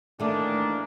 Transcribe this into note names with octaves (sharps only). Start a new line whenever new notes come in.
D#3 E3 A3 A#3 D4